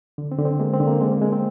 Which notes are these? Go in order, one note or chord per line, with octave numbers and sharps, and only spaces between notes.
D3
C4
D3
C4
G#3 A#3
C4
D3
A#3
G#3 C4
A#3
G#3 C4
C4